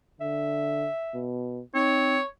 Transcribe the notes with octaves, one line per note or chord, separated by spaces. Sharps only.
D3 E5
B2
C4 D#4 C#5